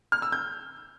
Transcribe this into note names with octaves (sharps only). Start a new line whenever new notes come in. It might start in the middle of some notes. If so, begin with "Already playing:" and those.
F6
E6
G6